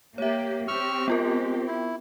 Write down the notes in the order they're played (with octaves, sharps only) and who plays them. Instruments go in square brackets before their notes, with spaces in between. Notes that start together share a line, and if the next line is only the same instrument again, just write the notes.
[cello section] A#3 G4 [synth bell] C#5 E5
[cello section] C4 G4 [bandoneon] C#6 E6 F6
[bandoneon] G#3 [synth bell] B3 F4 A#4
[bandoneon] E4